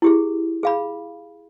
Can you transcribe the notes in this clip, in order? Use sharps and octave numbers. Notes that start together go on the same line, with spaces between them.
E4 G4 G#4
G#4 F5 B5